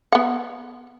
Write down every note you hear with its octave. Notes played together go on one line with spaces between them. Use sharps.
B3 F#5